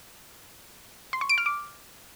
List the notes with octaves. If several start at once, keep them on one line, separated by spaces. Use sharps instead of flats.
C6
C#6
D7
F6
D6